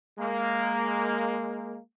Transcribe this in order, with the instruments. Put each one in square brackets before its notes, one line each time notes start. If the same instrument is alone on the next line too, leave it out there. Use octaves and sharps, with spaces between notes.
[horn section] G#3 A#3